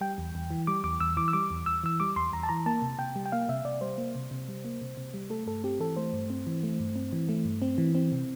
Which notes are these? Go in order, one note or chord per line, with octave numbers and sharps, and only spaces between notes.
G3 G5
E2
E2
E3
G3 D6
E2 D6
E2 E6
E3 D6
E6
G3 D6
E2
E2 E6
E3 E6
G3 D6
E2 C6
E2 A#5
A5
E3 A#5
A#3 A5
C3
C3 G5
G3
G5
A#3 F5
C3 E5
C3 D5
G3 C5
A#3
C3
C3
G3
A#3
C3
C3
G3
A3 A4
G2 A4
C4 G4
E3 A4
A3 C5
G2
C4
E3
A3
G2
C4
E3
A3
G2
C4
E3
C4
C3